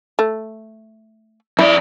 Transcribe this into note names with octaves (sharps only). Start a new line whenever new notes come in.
A3
F2 E4 D5